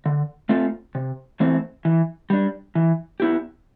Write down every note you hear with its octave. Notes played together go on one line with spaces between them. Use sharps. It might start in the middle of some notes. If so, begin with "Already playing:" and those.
D3
A3 C4 F4 A4
C3
E3 A3 C4
E3
G3 D4
E3
B3 E4 G4